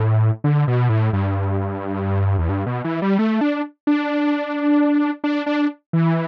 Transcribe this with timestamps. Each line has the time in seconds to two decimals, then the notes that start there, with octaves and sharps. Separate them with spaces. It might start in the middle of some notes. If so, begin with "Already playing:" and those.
Already playing: A2
0.44 D3
0.68 B2
0.89 A2
1.13 G2
2.38 E2
2.49 G2
2.66 B2
2.84 E3
3.02 G3
3.19 A3
3.41 D4
3.87 D4
5.24 D4
5.46 D4
5.93 E3